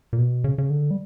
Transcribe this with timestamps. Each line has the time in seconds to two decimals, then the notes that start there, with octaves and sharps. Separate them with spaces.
0.13 A#2
0.19 B2
0.44 C#3
0.58 C#3
0.70 D3
0.91 G3